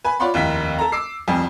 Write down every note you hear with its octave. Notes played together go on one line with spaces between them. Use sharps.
B4 G#5
F4 C#5 D5 F#5 B5 C6
F1 D#2 E4 A#4 B6
A4 A#5
D6 E6 C7
C2 F2 C3 G3 G#5